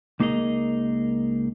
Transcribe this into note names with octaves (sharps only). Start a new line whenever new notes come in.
C#2 A#3 D#4 G#4 A#4 D#5